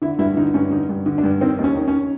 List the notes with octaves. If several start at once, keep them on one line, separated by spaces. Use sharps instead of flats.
D3 E4
G2 E4
D3 D#4
G2 C#4
D3 D#4
G2
D3
D4
G2
D#3 C4
D#2
C#4
D#3
C#4